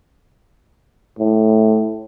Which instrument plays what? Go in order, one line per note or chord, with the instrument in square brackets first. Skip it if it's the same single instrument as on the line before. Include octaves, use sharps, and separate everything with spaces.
[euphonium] A2